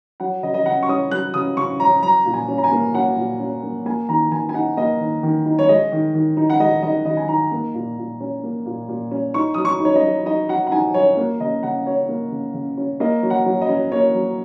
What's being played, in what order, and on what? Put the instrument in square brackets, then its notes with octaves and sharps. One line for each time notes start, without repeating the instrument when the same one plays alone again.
[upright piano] F#3 F#5
C#3 D#5
D#5
C#3 F#5
C#6
C#4 D#6
F#3 F#6
C#3 D#6
C#3 C#6
C#4 A#5
F#3 A#5
A#2
G#5
C#4
A#5
G#5
A#3
F#3 F#5
A#2
C#4
A#3
A#3 G#5
D#3 A#5
D#3 G#5
G#5
D#4 F#5
A#3 D#5
D#3
D#3
D#4
C#5
G#3 D#5
D#3
D#3
D#4
F#5
G#3 D#5
D#3 D#5
D#3 D#5
G#5
D#4 A#5
A#3
A#2
A#2
C#4
A#3
A#2
A#2
C#4
D#4 C#6
F#3 D#6
C#6
D#4
C#5
D#5
F#3
D#4 D#5
F#3 F#5
F#5
D#4 G#5
F#3 C#5
A#3
C#3 D#5
C#3 F#5
C#4 C#5
A#3
C#3
C#3
C#4
A#3 D#5
F#3
F#5
F#3
D#5
C#4
A#3 C#5
F#3